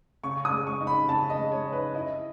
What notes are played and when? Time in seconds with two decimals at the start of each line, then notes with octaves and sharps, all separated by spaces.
0.24 C#3 C#6
0.45 D#6
0.51 G#3
0.67 C#6
0.81 D#4
0.87 B5
1.08 C#3 A5
1.30 D#5
1.37 G#3
1.52 C#5
1.66 D#4
1.72 B4
1.94 E4 D#5